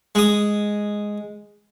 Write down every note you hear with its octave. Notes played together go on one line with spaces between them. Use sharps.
G#3 D#6